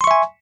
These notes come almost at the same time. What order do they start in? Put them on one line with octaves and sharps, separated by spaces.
C6 C#6 E5 G#5